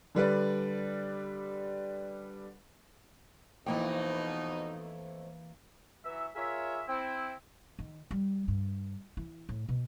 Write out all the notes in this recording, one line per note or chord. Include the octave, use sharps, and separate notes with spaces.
D3 G3 B4 D5
F2 B2 E3 A3 A#3 D#4 G5
E3 F#3 E5
F4 G#4 A#4 C#5 E5
C4 E4
D#3
G3
G2
E3
A2
B2